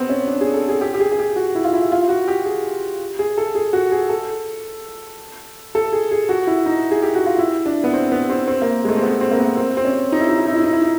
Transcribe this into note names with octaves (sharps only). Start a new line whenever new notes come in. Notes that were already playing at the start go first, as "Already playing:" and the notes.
Already playing: B3 C4
C#4
D4
G#4
A4
G#4
G4
G4
G#4
G#4
G4
F#4
E4
F4
E4
F4
F#4
G4
G#4
G#4
A4
G#4
F#4
G#4
A4
A4
G#4
G#4
F#4
E4
D#4
G#4
G4
F#4
F4
E4
D4
B3
C4
B3
C4
C4
A#3
G#3
A3
C4
B3
C4
A#3
B3
C4
C4
C#4
D#4
E4
D#4
E4
D#4
E4
D#4
E4
D#4